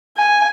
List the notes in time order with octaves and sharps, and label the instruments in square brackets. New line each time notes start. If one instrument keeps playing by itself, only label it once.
[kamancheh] G#5